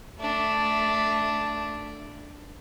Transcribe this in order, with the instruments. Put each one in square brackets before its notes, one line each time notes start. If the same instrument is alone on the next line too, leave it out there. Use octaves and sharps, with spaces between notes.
[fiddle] A3 D4